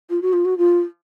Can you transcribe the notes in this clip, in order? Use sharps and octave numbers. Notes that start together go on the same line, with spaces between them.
F4
F#4
F4
F#4
F4